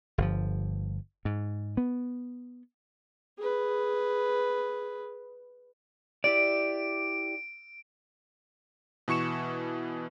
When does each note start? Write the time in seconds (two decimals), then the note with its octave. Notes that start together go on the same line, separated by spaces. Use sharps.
0.18 G1 G2 F3
1.25 G#2
1.77 B3
3.38 G#4 B4
6.24 E4 G4 D5 D7
9.08 B2 E3 C#6 C#7 E7